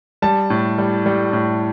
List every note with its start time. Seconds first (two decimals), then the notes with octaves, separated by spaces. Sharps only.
0.22 G3 A5
0.50 A2
0.78 G3
1.06 G3
1.33 A2